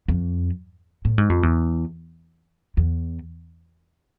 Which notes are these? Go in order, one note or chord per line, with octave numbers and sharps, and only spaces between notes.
F2
A2
G#2
F2
E2
E2